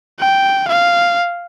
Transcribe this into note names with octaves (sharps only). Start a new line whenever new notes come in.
G5
F5